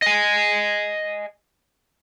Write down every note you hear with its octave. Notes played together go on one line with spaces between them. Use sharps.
D#5 G#5